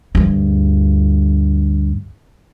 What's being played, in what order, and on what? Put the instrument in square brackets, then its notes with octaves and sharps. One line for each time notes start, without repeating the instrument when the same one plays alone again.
[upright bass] D2 G2